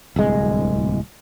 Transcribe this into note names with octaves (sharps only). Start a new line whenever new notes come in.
D1 C2 G#3